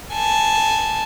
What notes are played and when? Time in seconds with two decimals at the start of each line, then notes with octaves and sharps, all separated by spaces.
0.14 G#5 A5